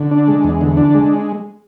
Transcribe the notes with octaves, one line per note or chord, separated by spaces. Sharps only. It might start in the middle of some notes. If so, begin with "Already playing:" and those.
Already playing: D3
D4
G#3
E2
D3
D4
G#3